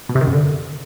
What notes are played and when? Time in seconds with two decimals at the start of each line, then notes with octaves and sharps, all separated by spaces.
0.09 B2
0.15 C3
0.21 D#3
0.27 F#2
0.33 D3